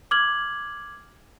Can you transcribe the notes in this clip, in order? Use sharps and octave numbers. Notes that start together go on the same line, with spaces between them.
D6 F6 G#6 F#7